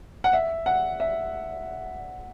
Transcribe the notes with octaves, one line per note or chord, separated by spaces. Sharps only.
F#5
E5
F#5
E5